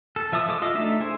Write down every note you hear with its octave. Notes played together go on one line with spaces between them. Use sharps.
A4
F3 E5 A5 D#6
G#3 A4 D6 D#6
F4 D#5 E5 D6
A3 D4 D#4 A4 E5
E4 G#4 C5